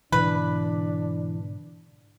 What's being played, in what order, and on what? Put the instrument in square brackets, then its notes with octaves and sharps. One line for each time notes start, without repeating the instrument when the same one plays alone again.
[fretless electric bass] G#2 B2 D3 [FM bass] E3 [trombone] D4 [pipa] B4